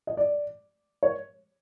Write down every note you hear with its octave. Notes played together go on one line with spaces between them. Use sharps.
D#5
D5
C#5